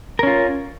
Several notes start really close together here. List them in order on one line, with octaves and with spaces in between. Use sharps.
A#4 C#4 F4